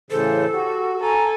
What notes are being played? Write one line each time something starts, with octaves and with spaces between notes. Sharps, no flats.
A2 C#3 E3 A4 C5
F#4 G4
A4 G#5 A#5